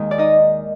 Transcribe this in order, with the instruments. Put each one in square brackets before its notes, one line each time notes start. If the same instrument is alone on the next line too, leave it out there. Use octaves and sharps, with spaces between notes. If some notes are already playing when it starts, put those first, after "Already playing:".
Already playing: [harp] D#2 D#3 G#3
D5
D#4 D#5